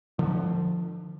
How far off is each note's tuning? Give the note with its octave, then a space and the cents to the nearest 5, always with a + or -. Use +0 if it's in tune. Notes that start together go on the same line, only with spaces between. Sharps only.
D3 +35 F3 +0